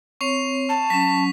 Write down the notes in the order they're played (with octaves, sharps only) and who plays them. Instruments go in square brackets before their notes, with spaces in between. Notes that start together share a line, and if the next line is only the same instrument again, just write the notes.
[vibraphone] C4 C#5 [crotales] C#6 C7 F7
[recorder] A5
[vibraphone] F#3 C#4 [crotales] B6